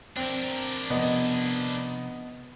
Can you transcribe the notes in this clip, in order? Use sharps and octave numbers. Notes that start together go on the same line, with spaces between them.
C4 D4 A#4
C3 F3 B3 D#5